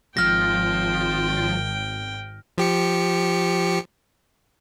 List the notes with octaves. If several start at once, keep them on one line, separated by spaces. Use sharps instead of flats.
G#1 F3 G5 F6 A#6
F3 G4 C#7